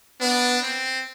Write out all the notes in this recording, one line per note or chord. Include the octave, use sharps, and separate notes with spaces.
B3 D4
C4